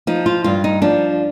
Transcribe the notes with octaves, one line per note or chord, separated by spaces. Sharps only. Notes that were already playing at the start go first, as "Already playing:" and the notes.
F3 D#4
F4
G2 F4
D#4
F3 D4